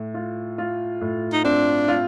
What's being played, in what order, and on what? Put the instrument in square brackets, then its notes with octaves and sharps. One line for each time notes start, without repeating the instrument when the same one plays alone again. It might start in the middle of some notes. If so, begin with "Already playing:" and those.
Already playing: [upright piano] A2
F4
F4
A2
[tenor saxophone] D#4
[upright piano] C4 [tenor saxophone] D4
[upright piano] F4